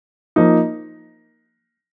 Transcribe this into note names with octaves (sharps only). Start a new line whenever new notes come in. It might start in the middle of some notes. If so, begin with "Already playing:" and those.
F3 A#3 D#4